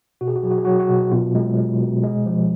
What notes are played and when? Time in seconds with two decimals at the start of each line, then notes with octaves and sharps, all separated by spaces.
0.21 B2 F#4
0.28 G#4
0.36 F#4
0.43 F#3 G#4
0.50 F#4
0.58 G#4
0.65 F#3 F#4
0.72 G#4
0.79 F#4
0.89 B2
1.12 B2 F4
1.35 G#3
1.57 G#3
1.80 B2
2.03 G#3
2.26 F3